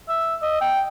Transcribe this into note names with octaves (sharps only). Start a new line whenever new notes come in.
E5
D#5
G5